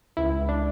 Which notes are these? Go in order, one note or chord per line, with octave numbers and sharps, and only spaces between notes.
C#2 E4
C#2
D4